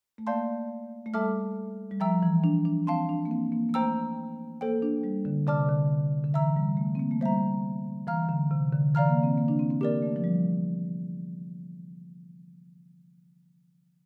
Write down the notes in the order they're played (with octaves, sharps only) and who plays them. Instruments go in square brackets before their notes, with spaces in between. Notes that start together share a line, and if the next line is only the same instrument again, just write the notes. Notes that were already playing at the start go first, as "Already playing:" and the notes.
[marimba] A3
[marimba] A#3 [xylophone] D5 F5 A5 C6 G6
[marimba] A3
[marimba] G3 [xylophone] A4 E5 A5 D6 F6
[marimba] G3
[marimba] F3 [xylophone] E5 G5 A#5 E6
[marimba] E3
D4
D4
[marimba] C4 [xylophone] F5 A5 C6
[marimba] D4
A#3
C4
A#3
A#3
[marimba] A3 [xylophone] C5 G5 A#5 E6
[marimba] A#3 [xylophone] A4 C5 G5
[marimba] D4
G3
D3
[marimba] C3 [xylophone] D5 A5 D6 F6
[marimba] D3
D3
[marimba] E3 [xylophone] E5 A#5 E6
[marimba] G3
A3
C4
A#3
A3
[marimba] G3 [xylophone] C5 E5 A#5
[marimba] E3 [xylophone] F5 A#5 F6
[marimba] D3
C3
D3
[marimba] E3 [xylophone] D5 F5 A#5 F6
[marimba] A#3
C4
A#3
D4
C4
C4
[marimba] A#3 [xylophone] G4 A#4 D5
[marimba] A3
F3
G3